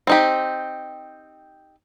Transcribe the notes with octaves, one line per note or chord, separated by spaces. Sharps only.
C4 D#4 G4